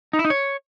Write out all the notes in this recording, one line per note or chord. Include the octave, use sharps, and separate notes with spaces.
D#4
E4
D#4
C#5